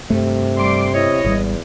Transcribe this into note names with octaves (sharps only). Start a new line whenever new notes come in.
G2 C3 A3
G3 C6 D6
E4 C#5 D#5
G#1 E2 D#3 G3